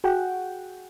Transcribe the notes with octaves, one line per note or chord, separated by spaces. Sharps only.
F#4 G#4 F#5 G5